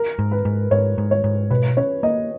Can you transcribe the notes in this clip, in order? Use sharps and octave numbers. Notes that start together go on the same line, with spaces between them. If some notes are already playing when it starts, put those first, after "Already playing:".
Already playing: A#4
G#2
B4
G#2
G#2 C#5
G#2
C#5
G#2
B2 B4
C#4 C#5
A#3 D#5